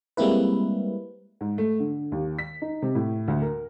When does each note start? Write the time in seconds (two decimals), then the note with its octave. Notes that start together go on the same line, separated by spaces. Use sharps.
0.17 G3 G#3 A#3 C4 E4 B4
1.41 G#2
1.58 A3
1.80 D3
2.12 D#2
2.39 B6
2.62 D#4
2.82 C3
2.95 A2
3.28 D2
3.42 A#4